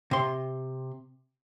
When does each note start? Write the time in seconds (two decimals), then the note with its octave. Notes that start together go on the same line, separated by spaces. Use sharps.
0.11 C3 C6